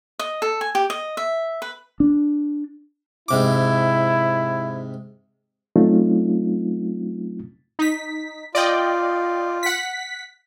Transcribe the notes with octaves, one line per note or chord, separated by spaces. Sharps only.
D#5
A4
G#5
G4
D#5
E5
B4
D4
G#2 C3 E4 D6
F#3 A3 C4 C#4 D#4 F4
D#4 B6
F4 D5 D#5 G5
F#5 B6